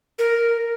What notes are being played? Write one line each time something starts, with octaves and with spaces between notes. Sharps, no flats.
A#4